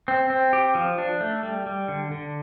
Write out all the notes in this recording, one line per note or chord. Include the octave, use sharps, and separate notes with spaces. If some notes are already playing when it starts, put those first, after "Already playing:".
C4
C4
G4
F3
D4
A3
G3
G3
D3
D3